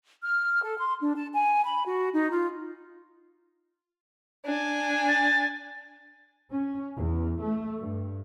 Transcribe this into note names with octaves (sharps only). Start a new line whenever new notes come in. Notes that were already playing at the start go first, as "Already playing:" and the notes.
F6
A4
C6
D4
A5
G#5
B5
F#4
D#4
F4
D4 G#5
A6
C#4
E2
A3
G2